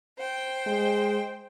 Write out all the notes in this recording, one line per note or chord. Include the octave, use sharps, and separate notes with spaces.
C5 G5
G#3